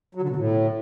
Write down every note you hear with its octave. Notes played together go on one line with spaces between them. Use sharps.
F#3
D3
B2
A2